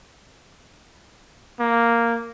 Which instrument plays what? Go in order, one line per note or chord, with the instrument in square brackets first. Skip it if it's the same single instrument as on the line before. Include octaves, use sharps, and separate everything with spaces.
[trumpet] A#3